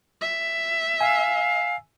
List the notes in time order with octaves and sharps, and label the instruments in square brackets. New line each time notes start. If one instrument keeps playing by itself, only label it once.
[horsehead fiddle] E5
[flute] F5 [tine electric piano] G#5 E6